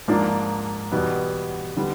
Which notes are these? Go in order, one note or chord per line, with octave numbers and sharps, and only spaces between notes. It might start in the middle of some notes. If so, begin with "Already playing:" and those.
G#2 F3 A#3 D4
E2 B2 G3 B3
D3 G3 B3